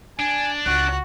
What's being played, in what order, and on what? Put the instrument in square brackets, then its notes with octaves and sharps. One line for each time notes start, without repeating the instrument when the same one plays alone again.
[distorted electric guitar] D4 [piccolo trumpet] G#5
[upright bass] C#2 [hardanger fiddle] F#4 [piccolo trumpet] F#6